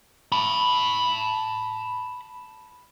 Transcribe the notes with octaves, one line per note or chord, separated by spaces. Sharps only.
A5 B5